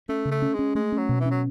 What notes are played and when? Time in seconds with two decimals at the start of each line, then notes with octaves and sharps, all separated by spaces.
0.09 A3 C#4
0.25 C#3
0.31 A3
0.42 C#4
0.54 G#3
0.59 C#4
0.75 G#3 A3
0.92 C#4
0.98 F#3
1.09 B2
1.20 E3
1.26 C#4
1.31 F#3